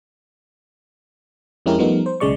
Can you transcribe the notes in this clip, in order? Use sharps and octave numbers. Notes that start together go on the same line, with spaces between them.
F2 G#3 C#4 E4 G4 A#4
F3 G3 A3 B3 D#4 A#4
C5
B1 C#3 G#3 D5 C#6